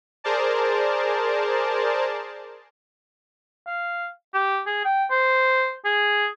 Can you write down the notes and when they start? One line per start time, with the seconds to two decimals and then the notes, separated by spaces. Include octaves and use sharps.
0.24 G#4 A#4 C5 D5 A5
3.67 F5
4.34 G4
4.67 G#4
4.85 G5
5.11 C5
5.85 G#4